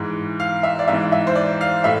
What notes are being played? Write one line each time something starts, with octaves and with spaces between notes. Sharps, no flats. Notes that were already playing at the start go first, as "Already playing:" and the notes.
Already playing: G#2 E3
F5
E5
D5
G#2 E3 E5
E5
C5
D5
F5
A2 E5